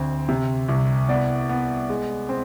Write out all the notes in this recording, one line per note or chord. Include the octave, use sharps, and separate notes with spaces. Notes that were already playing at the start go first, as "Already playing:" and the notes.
Already playing: D2 C4
C3
C2
B3 D5
B3
G#3
C4